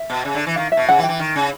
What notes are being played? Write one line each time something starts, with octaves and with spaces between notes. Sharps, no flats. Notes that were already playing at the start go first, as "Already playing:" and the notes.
Already playing: E5
B2
C#3
D3
E3
D#3 F5
E5
B2
C#3 F#5
E3
G5
E3
D#3
C#3